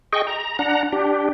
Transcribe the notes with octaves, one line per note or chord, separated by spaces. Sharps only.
G#4 D#5 G5 C#6
A#5
D4 F#5 A#5
D4 G4